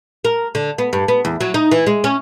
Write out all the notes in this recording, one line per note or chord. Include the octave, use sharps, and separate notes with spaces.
A#4
D3
B3
G2
B3
E2
F#3
D#4
E3
G#3
C#4